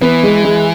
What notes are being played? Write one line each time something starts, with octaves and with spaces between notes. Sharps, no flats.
E3 B3
G#3
G#3